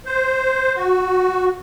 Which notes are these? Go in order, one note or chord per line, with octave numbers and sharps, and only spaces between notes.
C5
F#4